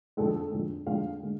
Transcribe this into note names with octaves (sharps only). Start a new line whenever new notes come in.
F2 D3 G#3 A4
F2 D3 G#3
F2 D3 G#3 F5
D3 G#3